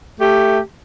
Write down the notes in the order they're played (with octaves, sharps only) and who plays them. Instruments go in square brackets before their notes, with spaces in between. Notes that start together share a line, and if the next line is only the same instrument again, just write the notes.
[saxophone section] A3 G4